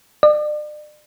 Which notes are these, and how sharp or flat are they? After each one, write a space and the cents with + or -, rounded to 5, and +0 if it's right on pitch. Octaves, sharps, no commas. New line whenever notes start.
D5 +40